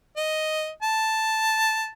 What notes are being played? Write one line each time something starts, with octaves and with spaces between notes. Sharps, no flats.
D#5
A5